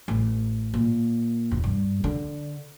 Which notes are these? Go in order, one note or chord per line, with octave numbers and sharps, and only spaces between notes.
A1
A#2
E1
G2
D3